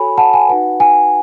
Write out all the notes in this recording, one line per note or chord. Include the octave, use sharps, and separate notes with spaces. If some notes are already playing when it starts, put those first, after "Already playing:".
Already playing: F#4 A4 C#5 G#5 B5
F#5 A5
G#5
D#4 F#4 B4 F#5
G#5